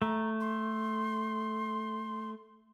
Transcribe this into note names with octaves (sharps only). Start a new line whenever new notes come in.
A3 A#5
C6